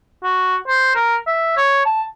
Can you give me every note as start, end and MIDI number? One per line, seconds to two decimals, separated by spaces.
0.24 0.56 66
0.68 0.93 72
0.95 1.16 70
1.27 1.53 76
1.57 1.82 73
1.86 2.03 81